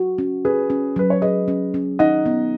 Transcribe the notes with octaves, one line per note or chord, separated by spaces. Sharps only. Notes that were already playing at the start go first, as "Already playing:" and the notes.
Already playing: F#4
C#4
C#4 G#4 B4
C#4
F#3 B4
C#5
G#4 B4 D#5
C#4
C#4
D#4 D#5 F#5
B3